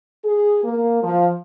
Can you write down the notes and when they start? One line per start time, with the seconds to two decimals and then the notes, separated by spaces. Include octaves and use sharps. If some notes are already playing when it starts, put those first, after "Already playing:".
0.24 G#4
0.63 A#3
1.02 F3